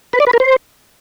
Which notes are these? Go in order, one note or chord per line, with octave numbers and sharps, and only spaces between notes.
B4
D5
B4
A#4
C5